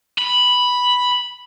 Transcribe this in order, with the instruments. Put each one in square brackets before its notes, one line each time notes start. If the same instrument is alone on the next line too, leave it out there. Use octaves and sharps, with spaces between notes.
[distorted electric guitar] B5